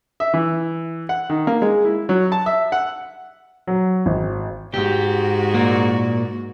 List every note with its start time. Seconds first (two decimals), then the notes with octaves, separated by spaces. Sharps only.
0.20 E5
0.34 E3
1.09 F#5
1.30 D#3
1.47 A#3
1.62 G#3
1.85 E4
2.09 F#3
2.32 A5
2.46 E5
2.72 F#5
3.67 F#3
4.06 G#1
4.74 G#2 F#4 G4
5.54 A#2 A#3